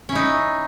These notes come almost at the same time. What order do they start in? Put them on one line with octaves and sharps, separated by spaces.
C#4 E4 D#4